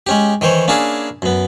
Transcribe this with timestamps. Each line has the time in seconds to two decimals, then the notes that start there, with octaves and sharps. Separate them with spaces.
0.07 G#3 C#4 G4
0.41 D#3 E3 C5 C#5
0.68 A#3 C#4 D4 E4 G#4 A5
1.22 F#2 B3